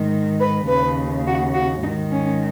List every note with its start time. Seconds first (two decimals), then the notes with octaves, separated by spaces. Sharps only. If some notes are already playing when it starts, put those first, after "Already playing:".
Already playing: G#2 D#3
0.40 B4
0.68 D#2 C#3 B4
1.26 F#4
1.54 F#4
1.82 G#2 D#4
1.87 D#3
2.11 C#4